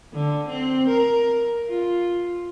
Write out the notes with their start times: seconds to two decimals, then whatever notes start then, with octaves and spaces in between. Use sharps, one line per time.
0.14 D3
0.49 C4
0.88 A#4
1.69 F4